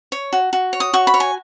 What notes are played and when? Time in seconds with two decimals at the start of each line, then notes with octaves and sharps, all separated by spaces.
0.12 C#5
0.33 F#4
0.53 F#4
0.73 C#5
0.80 D#6
0.93 F#4 C#6
1.07 B5
1.14 C#5
1.20 G#5